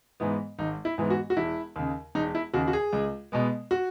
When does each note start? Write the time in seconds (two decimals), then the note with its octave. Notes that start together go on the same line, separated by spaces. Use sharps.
0.20 G#2 E3 G#3 B3
0.59 G#1 D#4
0.85 E4
0.98 G#2 E3 G#3 B3
1.10 F#4
1.30 F#4
1.37 E1 E4
1.76 D#2 C#3
2.15 E1 D#4
2.35 E4
2.54 D#2 C#3 F#4
2.68 F#4
2.73 G#4
2.93 C#2
3.32 B2 G#3 B3
3.71 F#4